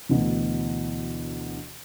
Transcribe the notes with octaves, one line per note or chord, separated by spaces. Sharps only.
D2 B2 E3